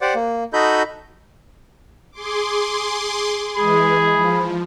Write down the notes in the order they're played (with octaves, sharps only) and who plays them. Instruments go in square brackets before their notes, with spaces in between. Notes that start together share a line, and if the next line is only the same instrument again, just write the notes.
[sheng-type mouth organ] G4 C5 D5 F#5 D6
A#3
D#4 F#4 A4 D#5 B5 G6
[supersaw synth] G#4 C6 D6
[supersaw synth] E3 G#3 [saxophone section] G#4 [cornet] B5
[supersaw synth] F3